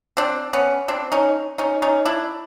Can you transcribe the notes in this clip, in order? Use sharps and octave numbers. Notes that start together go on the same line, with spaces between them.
C4 D4
B3 C#4
C4 D4
C#4 D#4
C#4 D#4
C#4 D#4
D4 E4